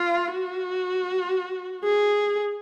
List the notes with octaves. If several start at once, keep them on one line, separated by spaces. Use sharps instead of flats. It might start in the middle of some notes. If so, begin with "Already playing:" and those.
Already playing: F4
F#4
G#4